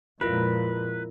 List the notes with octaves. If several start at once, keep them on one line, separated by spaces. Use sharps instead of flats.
F2 A#2 G#3 E4 F4 A#4 B4